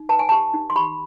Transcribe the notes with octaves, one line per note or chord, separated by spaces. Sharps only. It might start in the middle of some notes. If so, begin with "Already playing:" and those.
Already playing: D#4
B4 A5
G#5
G4 A5
D#4
C6
G4 B5